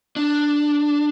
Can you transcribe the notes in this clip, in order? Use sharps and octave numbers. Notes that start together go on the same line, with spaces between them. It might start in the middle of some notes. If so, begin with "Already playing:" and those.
D4